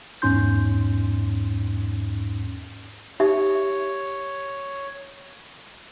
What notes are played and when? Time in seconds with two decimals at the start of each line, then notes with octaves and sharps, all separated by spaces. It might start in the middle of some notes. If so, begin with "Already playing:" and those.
0.22 E2 G#2 C#4 D#4 C6 G6
3.20 D#4 G4 C#5 E5